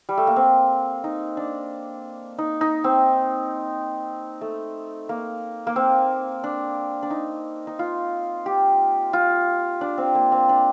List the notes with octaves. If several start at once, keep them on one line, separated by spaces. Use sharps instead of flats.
G3
A3
A#3
C4
D#4
D4
D#4
D#4
C4
A3
A#3
A#3
C4
D4
D4
D#4
D#4
F4
G4
F4
D4
C4
A#3
C4
D4